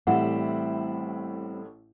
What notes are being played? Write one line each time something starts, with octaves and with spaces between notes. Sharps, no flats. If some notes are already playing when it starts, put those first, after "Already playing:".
A1 A2 G3 C4 E4 F#5